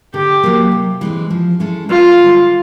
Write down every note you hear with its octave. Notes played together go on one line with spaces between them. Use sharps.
D3 G4
F#3 A#3
C3
E3 G#3 C4
F3
G#3 C#4 E4 A4
F#2 F4
D3 G3